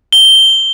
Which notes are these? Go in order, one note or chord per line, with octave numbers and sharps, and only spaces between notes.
G7